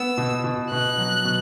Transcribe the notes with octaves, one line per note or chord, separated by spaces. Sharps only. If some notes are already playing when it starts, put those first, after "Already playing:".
Already playing: B3 E6
B2
B2
B2 F#6
F#3
B2